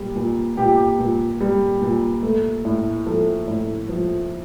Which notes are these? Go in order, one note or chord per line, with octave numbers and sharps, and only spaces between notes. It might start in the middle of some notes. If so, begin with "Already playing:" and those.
Already playing: A#2 G3
A#2
A#2 G4
G4
A#2
G3
A#2
A3
A2
F3 A4
A2
F3